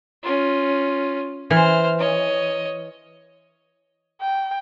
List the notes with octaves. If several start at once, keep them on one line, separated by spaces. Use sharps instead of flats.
C#4 F4
E3 C5 F6
C#5 D#5
G5